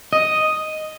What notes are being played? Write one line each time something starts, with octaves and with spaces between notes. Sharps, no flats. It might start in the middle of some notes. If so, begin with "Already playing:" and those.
D#5